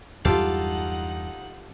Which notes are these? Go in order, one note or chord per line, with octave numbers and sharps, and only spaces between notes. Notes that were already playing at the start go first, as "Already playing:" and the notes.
E2 G2 F#3 D#4 F4 G4 A4 F#5